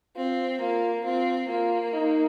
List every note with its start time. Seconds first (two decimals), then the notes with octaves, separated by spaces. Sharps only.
0.16 C4 F4
0.60 A#3 F4
1.05 C4 F4
1.48 A#3 F4
1.93 D#4